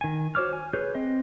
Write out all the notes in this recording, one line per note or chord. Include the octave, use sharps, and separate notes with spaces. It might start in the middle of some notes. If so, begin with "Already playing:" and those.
D#3 G#5
F#4 C5 C#5 D6 F6
G#5
G#4 B4 C#5 G6
C4 D#5